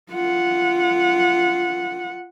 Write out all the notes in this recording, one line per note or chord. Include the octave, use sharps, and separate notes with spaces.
F4 F#5